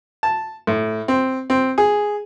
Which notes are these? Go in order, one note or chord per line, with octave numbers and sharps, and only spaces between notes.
A5
A2
C4
C4
G#4